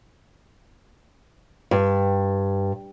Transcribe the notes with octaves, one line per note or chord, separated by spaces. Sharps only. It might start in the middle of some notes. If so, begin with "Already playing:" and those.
G2